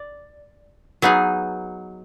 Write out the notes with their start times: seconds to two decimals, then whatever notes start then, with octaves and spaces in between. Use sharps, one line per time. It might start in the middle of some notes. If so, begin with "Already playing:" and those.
Already playing: D5
1.02 F#3 B3 D#4 G#4